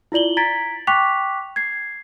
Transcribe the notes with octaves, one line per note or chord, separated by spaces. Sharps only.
E4 F4 D5 F#7 G7
A#5 G#6 A6 B6 D7
G5 C#6 D6 F#6 B6 F7
G#6 C7